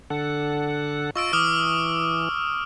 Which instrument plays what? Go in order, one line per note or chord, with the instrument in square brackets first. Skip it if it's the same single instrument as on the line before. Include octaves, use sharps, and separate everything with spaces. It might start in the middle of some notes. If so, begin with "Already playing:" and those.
[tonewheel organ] D3 A4 F#5
[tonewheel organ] F4 D#5 [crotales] C#6 E6 D7
[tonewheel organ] E3 [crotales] D6 D#6 F6